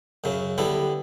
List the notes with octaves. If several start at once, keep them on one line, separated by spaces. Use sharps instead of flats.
F#2 C#3 F#3
D3 G3 B3 E4